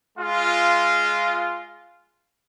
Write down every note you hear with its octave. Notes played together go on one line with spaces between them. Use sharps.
G#3 F4